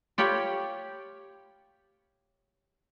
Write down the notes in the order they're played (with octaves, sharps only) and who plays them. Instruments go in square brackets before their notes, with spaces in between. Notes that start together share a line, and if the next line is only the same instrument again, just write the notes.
[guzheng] F4 G4 C#5 G5 B5